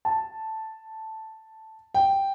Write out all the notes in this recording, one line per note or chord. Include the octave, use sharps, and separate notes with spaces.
A5
G5